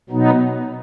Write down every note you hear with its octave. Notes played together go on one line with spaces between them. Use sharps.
B2 F#3 B3 D#4